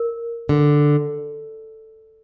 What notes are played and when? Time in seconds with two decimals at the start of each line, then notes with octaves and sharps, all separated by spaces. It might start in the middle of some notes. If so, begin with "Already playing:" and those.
Already playing: A#4
0.49 D3